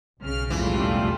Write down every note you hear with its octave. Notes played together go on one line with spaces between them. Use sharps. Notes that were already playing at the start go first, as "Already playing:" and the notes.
B1 C#3 F6
E1 A1 F2 E3 G3 A3 F4